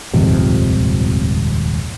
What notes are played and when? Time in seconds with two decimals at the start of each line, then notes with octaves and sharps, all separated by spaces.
0.13 D#1 G#1 F2 C3